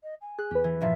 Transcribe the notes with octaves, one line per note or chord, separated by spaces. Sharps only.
D#5
G#5
G#4 F#6
E2 G4 B4
E3
G2 A#2 F3 E5